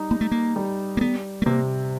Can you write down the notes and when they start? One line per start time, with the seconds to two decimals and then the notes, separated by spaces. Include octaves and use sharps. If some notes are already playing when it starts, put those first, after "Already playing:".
Already playing: G3 D#4
0.11 A#3 D#4
0.21 A3
0.31 A#3
0.56 G3
0.97 A#3
1.01 G3 B3
1.42 A3
1.46 C3 A#3